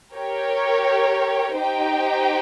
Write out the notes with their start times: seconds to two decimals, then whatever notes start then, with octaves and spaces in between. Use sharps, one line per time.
0.15 G4 A#4 C#5 G5
1.58 D#4 G4 C5 G5